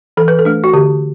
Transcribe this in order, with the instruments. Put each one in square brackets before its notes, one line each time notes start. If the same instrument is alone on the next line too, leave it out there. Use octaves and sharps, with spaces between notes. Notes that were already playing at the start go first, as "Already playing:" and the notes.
[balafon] E3 A4
B4
A4
A3 D4
F#4
D3 G4